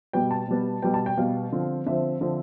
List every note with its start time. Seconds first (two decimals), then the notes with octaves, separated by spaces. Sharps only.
0.13 B2 G3 B3 G5
0.31 A5
0.48 B2 G3 B3
0.82 B2 G3 B3 G5
0.94 A5
1.06 G5
1.17 B2 G3 B3 F5
1.52 D3 F3 C4
1.86 D3 F3 C4 E5
2.21 D3 F3 C4